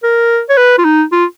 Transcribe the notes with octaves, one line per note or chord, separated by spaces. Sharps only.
A#4
C#5
B4
F4
D#4
F4